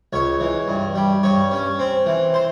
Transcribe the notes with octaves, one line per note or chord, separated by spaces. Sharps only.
C#2 C#5
E3
G2
G3
G2 C#5
C#4
C4
E3
C5